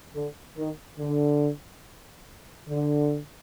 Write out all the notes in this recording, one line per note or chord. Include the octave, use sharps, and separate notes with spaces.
D3
D#3
D3
D3